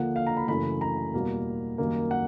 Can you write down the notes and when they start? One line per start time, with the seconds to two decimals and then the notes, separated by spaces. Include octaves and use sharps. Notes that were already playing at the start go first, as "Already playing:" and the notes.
Already playing: D#2 D3 F3 A#3 F#5
0.16 F5
0.27 A#5
0.37 B5
0.48 F#2 C#3 E3 A3 B5
0.81 A#5
1.14 E2 B2 G3 A#3
1.78 F#2 D#3 G3 A#3
2.11 F#5